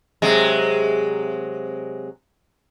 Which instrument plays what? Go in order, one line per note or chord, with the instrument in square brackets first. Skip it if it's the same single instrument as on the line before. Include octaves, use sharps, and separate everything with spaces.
[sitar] C3 F#3 G#3